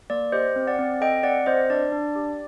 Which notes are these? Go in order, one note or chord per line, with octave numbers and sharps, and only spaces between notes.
A#3 D5
G4 C5 D#5
C4
D5 F#5
C4
A4 D#5 G5
C4 D5 F#5
C4 C5 D#5
D4 D5
D4
G4